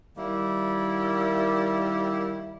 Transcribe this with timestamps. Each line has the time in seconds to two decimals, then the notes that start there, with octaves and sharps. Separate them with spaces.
0.17 D#3 G3 A#3 E4